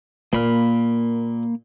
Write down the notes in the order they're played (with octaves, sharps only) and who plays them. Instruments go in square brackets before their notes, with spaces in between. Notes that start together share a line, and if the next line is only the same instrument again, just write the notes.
[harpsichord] A#2 [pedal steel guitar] A#3 B5 F6